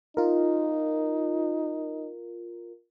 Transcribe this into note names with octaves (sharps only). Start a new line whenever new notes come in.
D#4 F4 A#4